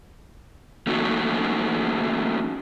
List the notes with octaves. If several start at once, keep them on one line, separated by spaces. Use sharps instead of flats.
A3 A#3 C#4 D#4 F#4